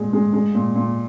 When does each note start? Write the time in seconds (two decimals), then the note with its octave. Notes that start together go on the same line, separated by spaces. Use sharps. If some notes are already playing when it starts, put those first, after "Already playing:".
Already playing: A#2 G#3
0.13 G#3
0.33 G#3
0.55 A#2
0.76 A#2